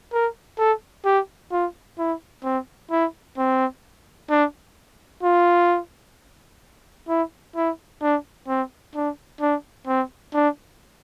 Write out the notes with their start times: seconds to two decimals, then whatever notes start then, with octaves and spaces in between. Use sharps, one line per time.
0.13 A#4
0.58 A4
1.05 G4
1.52 F4
1.99 E4
2.44 C4
2.91 E4
3.38 C4
4.30 D4
5.23 F4
7.08 E4
7.56 E4
8.02 D4
8.48 C4
8.95 D4
9.41 D4
9.87 C4
10.34 D4